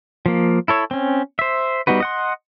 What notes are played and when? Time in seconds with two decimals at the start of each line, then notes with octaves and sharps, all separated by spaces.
0.26 F3 A#3
0.68 E4 A4 C#5
0.91 C4 C#4
1.39 C5 E5
1.87 G3 B3 D#4 F#4 B4
2.00 D#5 F#5 C6